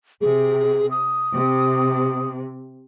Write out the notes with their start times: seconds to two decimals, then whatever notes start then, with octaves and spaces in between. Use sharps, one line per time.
0.21 C3 G#4
0.91 D#6
1.33 C3